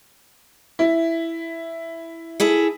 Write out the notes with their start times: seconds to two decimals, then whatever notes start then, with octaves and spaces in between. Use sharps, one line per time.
0.79 E4
2.40 E4 G#4 A4